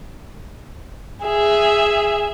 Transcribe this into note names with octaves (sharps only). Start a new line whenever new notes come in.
G#4 E5